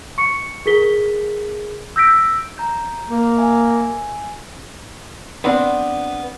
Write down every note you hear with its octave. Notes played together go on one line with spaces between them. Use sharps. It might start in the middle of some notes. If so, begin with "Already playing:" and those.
C#6 C#7
G#4 A#4 B6 G7
E6 G6 A#6 B6 D7
A#5 G6
A#3
E5 G#5
B3 C4 D4